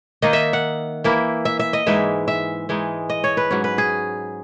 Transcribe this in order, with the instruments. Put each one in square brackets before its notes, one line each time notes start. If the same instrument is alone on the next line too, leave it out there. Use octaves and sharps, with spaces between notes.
[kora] D#3 A#3 D#4 D#5
E5
F#5
E3 A#3 E4
E5
E5
D#5
G#2 E3 G#3 D#4 E5
E5
E3 G#3 D#4
D#5
C#5
B4
G#2 F#3 C#4
B4
G#4